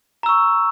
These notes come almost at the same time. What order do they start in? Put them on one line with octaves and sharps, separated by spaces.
A#5 E6 C#6